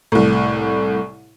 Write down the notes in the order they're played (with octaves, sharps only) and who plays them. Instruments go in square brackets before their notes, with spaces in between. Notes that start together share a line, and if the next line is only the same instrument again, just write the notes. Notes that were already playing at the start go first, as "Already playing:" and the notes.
[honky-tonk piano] C2 A2